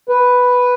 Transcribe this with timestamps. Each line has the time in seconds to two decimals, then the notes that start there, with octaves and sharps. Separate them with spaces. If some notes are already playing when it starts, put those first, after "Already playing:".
0.09 B4